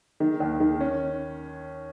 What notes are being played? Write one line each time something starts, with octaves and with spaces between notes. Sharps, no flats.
D#3
D#2
D#3
C#4